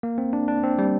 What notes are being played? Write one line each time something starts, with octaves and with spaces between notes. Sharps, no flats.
A#3
C4
D4
D4
C4
G3